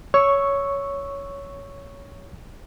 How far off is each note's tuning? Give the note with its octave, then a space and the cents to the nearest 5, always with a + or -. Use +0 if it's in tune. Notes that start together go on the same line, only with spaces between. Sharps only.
C#5 +10 C#6 +0 E6 +0